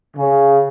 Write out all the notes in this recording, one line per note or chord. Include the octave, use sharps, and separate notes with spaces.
C#3